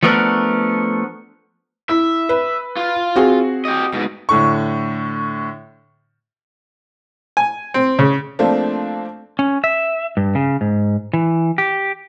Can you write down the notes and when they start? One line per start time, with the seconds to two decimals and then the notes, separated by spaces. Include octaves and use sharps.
0.03 F3 A3 B3 D4 A#4
1.89 E4 E5
2.29 B4
2.77 F4
3.16 C4 F#4 G#4
3.65 G4 D#5
3.94 G#2 B2
4.29 A2 D3 C#6
7.37 G#5
7.74 C4
7.99 C#3
8.39 F3 A3 A#3 C4 D4
9.39 C#4
9.64 E5
10.17 G2
10.35 C#3
10.61 G#2
11.13 E3
11.58 G4